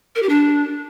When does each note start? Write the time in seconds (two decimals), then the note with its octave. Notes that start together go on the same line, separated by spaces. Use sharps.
0.15 A#4
0.22 G4
0.29 D4